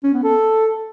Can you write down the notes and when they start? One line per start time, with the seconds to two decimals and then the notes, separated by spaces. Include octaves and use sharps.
0.04 C#4
0.14 B3
0.23 A4